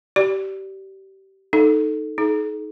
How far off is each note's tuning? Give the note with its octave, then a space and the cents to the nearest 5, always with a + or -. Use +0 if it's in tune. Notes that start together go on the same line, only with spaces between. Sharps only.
G4 -25 D5 +0
D#4 +0 A4 +0
D#4 +15 G#4 +45